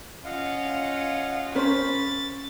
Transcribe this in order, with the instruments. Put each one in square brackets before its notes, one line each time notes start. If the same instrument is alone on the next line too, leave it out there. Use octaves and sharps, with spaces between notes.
[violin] C#4 F4 [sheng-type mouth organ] D#5 F5 F#5
[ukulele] C#4 [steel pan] A#4 C5 C#5 [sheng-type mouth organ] B5 [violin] A6